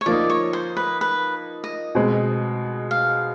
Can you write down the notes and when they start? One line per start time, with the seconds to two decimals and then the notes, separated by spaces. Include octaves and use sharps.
0.01 C#5
0.06 F3 A#3 D#4 D5
0.30 C#5
0.53 C5
0.77 B4
1.01 B4
1.64 D#5
1.95 B2 G#3 C4
2.91 F5